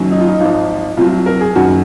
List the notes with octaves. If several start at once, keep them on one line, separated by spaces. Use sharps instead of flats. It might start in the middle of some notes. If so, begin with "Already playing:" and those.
Already playing: F#1 F#2 D#3 F#3
D#4
F4
D#4
G#1 G#2 F3
C2 C3 F#3 F4
A#4
G#4
F#1 F#2 D#3 F#4